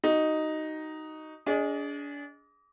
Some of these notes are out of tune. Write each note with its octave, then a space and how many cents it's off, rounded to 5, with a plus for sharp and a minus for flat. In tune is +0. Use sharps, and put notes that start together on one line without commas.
D#4 +0 F#4 +30
D4 -35 G#4 +0 D#5 +0